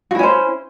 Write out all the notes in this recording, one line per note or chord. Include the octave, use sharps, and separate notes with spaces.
C#4 E4 F#4 C5